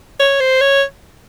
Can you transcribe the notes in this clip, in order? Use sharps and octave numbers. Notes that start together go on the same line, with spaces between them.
C#5
C5
C#5